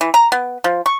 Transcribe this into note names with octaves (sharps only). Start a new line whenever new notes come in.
E3
A#5
B3
F3
C#6